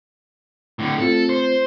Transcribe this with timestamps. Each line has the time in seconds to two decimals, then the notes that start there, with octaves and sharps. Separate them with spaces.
0.79 A2 D3
0.98 A3 C4 F4 A4
1.29 C5